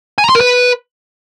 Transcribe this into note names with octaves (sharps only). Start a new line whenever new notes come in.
G#5
A#5
C6
A#4
B4